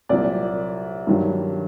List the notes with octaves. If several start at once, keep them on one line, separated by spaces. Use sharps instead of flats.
C2 A#2 F#3 D5
G2 D#3 F#3